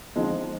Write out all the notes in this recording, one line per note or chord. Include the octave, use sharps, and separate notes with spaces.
D3 F3 G#3 C4 D#4